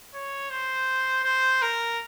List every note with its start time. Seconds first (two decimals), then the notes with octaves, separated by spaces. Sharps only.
0.14 C#5
0.50 C5
1.24 C5
1.62 A#4